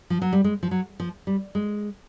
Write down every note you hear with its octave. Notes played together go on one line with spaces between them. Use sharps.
F3
F#3
G3
G#3
F3
F#3
F3
G3
G#3